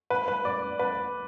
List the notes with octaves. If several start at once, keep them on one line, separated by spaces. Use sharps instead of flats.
B4
B4
D5
B4